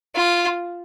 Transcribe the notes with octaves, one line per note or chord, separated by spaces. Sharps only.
F4